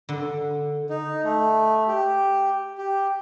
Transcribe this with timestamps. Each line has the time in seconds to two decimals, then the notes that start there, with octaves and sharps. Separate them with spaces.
0.09 D3
0.89 D#4
1.24 A3
1.88 G4
2.78 G4